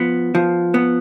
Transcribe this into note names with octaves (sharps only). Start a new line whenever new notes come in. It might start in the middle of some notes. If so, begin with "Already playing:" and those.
Already playing: F3 B3
F3
B3